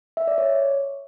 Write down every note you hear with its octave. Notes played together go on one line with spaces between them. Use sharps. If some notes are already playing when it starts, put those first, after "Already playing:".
E5
D5
C#5